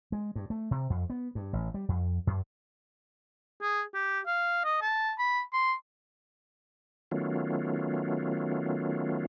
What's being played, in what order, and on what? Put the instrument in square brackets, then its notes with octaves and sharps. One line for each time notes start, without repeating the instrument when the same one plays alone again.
[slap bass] G#3
G2
A3
C3
F2
B3
G2
A1
G3
F2
F#2
[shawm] G#4
G4
F5
D#5
A5
B5
C6
[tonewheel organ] D#3 F#3 A3 B3 C#4 F4